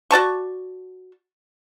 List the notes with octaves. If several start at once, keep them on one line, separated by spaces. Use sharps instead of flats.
F#4 D5 A5 C#6